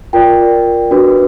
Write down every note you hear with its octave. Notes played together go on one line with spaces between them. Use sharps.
F4 A#4 D5 G5
D4 F#4 B4